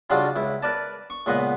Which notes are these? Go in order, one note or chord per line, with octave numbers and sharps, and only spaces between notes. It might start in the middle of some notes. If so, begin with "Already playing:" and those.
C#3 F#3 G3 D4 D#4 F4
C#2 E4
A#4 B4 D5 A5
C#6
C#2 A#2 B3 D#5 F#5